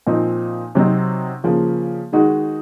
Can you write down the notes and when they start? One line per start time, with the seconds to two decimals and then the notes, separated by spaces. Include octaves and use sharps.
0.07 A#2 F3 C4 D#4
0.75 C3 F#3 C4 D#4
1.44 C#3 F3 A#3
2.12 D#3 G#3 D#4 F#4